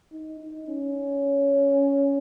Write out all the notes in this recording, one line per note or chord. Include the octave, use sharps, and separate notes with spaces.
D#4
D#4
C#4